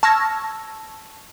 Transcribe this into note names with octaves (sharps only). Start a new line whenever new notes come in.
A5 C#6 E6 F6 G#6 A#6